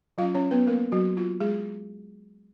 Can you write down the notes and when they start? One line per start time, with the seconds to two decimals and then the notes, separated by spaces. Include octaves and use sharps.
0.18 F#3 C#4 F4 F5
0.34 C#4 C#5
0.51 B3 B4
0.67 A#3 A#4
0.92 F#3 F#4
1.17 F4
1.40 G#3 G#4